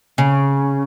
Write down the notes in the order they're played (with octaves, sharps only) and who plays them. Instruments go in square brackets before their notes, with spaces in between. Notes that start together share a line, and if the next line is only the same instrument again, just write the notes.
[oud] C#3